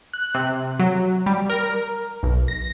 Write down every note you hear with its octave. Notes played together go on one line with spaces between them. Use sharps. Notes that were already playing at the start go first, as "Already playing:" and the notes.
F#6
C3
F#3
G3
A#4
B1
A#6